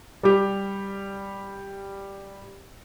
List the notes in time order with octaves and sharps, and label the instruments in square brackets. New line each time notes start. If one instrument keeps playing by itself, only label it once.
[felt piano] G3 G4